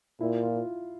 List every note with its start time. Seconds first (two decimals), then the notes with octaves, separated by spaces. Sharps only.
0.20 A#2 E4
0.43 F4